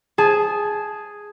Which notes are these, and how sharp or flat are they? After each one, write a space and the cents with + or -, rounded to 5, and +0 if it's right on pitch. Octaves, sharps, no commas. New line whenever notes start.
G#4 +0 A5 -20